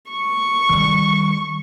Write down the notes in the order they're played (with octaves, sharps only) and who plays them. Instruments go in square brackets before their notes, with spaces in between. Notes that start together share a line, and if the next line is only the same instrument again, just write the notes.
[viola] C#6
[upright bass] D#3 G3